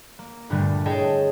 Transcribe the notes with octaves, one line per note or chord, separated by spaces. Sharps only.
A#3
G2 A#2 D3 G3 A3
E4 G#4 C#5 D#5 G5 A5